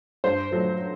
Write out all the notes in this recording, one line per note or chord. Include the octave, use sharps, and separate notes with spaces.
G2 C5
F#3 A3